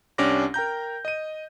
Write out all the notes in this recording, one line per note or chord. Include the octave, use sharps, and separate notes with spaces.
C2 C#4 D4 G4 D6 A#6
A#4 G5 A#5 G6
D#5 D#7